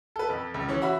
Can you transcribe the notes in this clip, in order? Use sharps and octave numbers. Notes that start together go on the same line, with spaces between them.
A4 B4
F2
C#2
E3 C#4
F#4 E5 B5